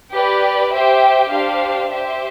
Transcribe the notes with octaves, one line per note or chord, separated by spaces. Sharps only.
G4 B4 D5
G4 C5 E5 G5
D4 G4 C5 F5
G4 C5 E5